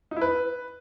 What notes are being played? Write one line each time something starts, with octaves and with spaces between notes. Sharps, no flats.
D#4
E4
B4